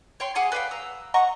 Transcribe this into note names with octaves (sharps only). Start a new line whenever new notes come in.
C#5 G5 C6
G#4 F#5 G#5 D6
B4 D5 F5 G5
A#5 E6
D#5 F#5 A#5 C#6